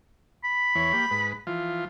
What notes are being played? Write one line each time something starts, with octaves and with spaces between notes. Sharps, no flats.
B5
E2 E3 C#5
A#3 G4
G#2 B4
E3 F3 F4